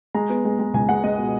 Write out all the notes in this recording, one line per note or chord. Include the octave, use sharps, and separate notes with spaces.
G#3 A#5
B3
G#3
G#3
C#2 G#5
G#3 F#5
G#3 D#5
B2